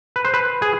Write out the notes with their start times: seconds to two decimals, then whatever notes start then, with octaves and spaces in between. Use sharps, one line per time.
0.16 B4
0.25 C5
0.34 B4
0.62 G#4